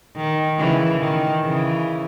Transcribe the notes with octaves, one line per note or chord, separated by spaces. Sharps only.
D#3
C#3 E3
D#3
C#3 E3